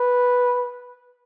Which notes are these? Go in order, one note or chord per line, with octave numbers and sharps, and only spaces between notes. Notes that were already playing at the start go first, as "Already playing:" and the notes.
Already playing: B4